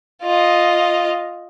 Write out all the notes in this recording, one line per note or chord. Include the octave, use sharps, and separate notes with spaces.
F4 D#5